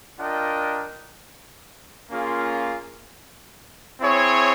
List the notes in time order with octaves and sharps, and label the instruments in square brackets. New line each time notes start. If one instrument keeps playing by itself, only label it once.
[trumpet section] D4 F4 A#4 D#5 G5
A#3 C#4 F4 G#4
C4 E4 G#4 C#5